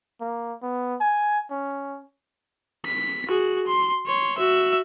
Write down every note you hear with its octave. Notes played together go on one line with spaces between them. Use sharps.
A#3
B3
G#5
C#4
B6
F#4 G#4
C6
C#5 C6
F#4 E5